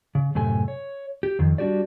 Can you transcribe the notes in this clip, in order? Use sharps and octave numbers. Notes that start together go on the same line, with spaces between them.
C#3
F#2 A2 C3 A4 G#5
C#5
G4
F2 D#3
G3 D4 F#4 G4 D5